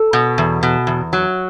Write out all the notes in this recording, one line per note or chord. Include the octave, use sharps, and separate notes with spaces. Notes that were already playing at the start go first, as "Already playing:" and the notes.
Already playing: A4
B2
E2
B2
E2
F#3